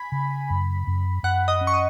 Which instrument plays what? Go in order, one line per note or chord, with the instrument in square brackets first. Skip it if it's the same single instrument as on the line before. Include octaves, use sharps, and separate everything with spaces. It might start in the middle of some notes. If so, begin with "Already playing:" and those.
Already playing: [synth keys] G#5 B5
[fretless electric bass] C#3
F#2
F#2
[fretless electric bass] F#2 [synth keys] F#5
[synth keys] D#5
[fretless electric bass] C#4
[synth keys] C#6
D#6